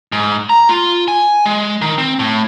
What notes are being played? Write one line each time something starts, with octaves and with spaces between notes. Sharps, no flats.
G#2
A#5
F4
G#5
G#3
D#3
C4
A2